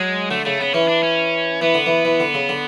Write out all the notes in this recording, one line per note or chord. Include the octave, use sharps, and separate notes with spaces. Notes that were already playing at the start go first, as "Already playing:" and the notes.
Already playing: F#3 G#3
D3 A3
C#3 A3
C#3 B3
E3 C#4
D4
C#4
E3 B3
D3
E3
E3
D3
C#3
D3